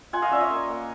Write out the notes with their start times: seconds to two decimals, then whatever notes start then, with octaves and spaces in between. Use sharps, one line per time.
0.13 F4 F#5 G#5
0.22 D#5 F5
0.31 C#4 D5 E5
0.41 C#5 D#5
0.51 A#3
0.70 A#3